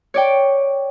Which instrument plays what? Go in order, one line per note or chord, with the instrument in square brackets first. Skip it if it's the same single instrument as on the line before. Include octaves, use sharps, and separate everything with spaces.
[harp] C#5 D5 G5